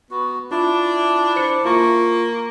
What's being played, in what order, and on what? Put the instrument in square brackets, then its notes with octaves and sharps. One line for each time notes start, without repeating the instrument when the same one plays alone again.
[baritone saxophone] B3 [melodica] F#4
[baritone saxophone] D4 [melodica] E4 A5 D6 [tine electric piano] F4
[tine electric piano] C5 C#7
[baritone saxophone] A#3 [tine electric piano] F4 C#6